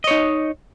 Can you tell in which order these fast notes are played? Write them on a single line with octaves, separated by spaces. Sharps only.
D#5 C#5 D#4